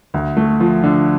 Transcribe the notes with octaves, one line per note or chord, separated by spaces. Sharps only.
D2
A3
F3
D3